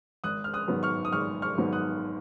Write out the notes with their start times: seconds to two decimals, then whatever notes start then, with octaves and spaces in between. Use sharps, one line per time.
0.24 G#1 D#6 F#6
0.44 F6
0.54 D#6 F#6
0.68 G#2 D#3 F#3 B3
0.83 C#6 F6
1.05 D#6
1.12 G#1 C#6 F6
1.42 C#6 F6
1.58 G#2 D#3 F#3 B3
1.72 D#6 F#6